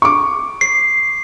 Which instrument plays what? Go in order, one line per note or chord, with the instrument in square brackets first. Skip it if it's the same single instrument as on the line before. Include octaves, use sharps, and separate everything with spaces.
[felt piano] C#6 D6
[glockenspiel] C7